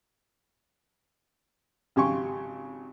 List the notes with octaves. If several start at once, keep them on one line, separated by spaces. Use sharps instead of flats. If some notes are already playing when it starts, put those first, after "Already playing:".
G#1 C#3 G4 G#5 C6 C#6